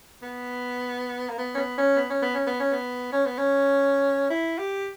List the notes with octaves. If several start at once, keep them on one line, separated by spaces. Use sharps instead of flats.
B3
A#3
B3
C#4
B3
C#4
B3
C#4
B3
C#4
B3
C#4
B3
C#4
B3
C#4
E4
G4